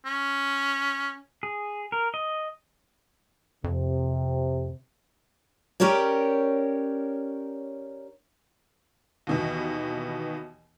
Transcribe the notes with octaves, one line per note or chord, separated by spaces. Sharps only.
C#4
G#4
A#4
D#5
F2 C3
C#4 G4 A#4 C#5 D5
D#2 B2 E3